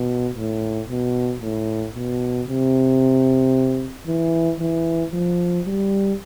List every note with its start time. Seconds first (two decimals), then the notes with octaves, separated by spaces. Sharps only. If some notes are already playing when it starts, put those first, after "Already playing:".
Already playing: B2
0.36 A2
0.89 B2
1.42 A2
1.95 B2
2.48 C3
4.07 E3
4.60 E3
5.13 F3
5.66 G3